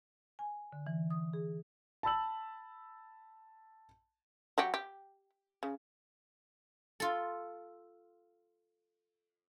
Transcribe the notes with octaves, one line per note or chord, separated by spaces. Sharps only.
G#5
D3
E3
D#6
G#4
A5 B5 E6 F#7
F#3 F#4 G4
G4
C#3
F4 A4